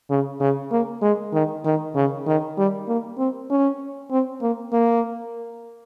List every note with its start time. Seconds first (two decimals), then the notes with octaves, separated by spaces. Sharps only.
0.10 C#3
0.40 C#3
0.72 A#3
1.02 G#3
1.33 D#3
1.65 D#3
1.95 C#3
2.27 D#3
2.57 G3
2.88 A#3
3.18 C4
3.50 C#4
4.11 C4
4.42 A#3
4.73 A#3